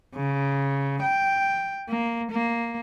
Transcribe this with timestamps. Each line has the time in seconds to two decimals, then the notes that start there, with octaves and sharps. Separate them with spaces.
0.15 C#3
1.02 G5
1.89 A#3
2.32 A#3